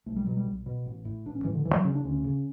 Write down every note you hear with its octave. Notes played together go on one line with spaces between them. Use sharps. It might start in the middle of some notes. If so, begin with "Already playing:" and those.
B1 A3
G3
B2 F#3
G3
B1
B2
A1
A2
A1 D4
C#4
A2 E3
D3
D2 E3
F#3
C#3 C#4
D4
D2 C#4
C#3